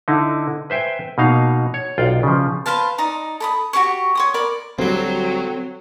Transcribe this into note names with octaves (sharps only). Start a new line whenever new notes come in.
D3 D#4 E4
B4 C5 E5 G5 G#5
B2 A#3 D#4 F5
C#5
B1 F4 D5 G5
C#3 F3
B4 C5 F5 A5
D#4 D5 A#5
A4 B5 D#6
F#4 G4 C#5 C#6
C#5 C6 D#6
A#4 D5 B5
D2 F#3 G3 C4